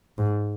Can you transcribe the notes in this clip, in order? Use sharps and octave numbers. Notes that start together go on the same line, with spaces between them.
G#2